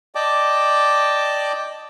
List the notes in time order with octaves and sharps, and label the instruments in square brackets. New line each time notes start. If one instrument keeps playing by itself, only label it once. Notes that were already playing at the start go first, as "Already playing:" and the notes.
[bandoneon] D5 D#5 G5 A5 D6